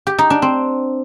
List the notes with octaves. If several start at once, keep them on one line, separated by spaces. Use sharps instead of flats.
G4
D#4
D4
C4